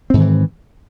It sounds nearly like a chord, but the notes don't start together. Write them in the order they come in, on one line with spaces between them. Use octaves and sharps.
C4 G#2 D#3 E3